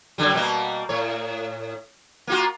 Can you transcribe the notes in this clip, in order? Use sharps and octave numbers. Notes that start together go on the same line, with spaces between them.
F#2 D3 G3
B2 G3 A#3
A2 C#5
A#3 F4 F#4